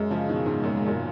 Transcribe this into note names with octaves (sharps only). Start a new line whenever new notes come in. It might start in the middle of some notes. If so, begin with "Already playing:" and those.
Already playing: F#2 G#3
C#3 F3
B2 D#3
G#2 B2
F#2 A#2
F#2 A#2